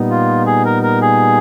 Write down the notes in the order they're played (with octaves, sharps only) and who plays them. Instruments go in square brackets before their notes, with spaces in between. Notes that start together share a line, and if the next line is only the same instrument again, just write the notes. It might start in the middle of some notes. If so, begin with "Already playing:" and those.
Already playing: [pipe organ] A#2 G3 B3 D#4
[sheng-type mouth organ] F4
G#4
A#4
A#4
G#4